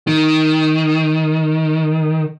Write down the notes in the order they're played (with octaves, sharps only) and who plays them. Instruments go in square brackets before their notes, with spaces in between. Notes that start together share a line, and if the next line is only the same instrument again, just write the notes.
[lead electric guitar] D#3